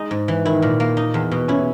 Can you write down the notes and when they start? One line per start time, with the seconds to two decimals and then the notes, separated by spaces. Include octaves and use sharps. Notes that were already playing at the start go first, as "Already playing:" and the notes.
Already playing: G#3 D#4
0.11 G#2
0.28 E3
0.45 D#3 E4
0.62 A#2
0.80 A#3
0.97 D#4
1.14 E2
1.31 B2
1.48 C#4 E4